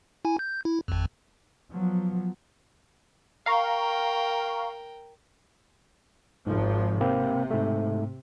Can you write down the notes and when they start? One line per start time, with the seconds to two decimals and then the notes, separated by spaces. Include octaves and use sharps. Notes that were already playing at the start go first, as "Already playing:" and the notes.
0.25 E4 G#5
0.39 G6
0.65 E4
0.88 G#1 F2
1.71 F3 F#3 B3
3.46 A#4 F5 G5 A#5 C#6
6.47 G#1 G#2 F3
7.01 C3 A#3 C4
7.51 G#2 A3